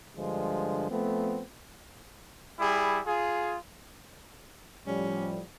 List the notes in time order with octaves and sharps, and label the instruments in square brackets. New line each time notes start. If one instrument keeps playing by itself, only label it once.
[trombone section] G2 D3 F3 G#3
F3 A3 B3 C4
[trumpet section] G3 E4 G#4
F4 G#4
[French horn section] A2 F3 G3 [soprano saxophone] C#4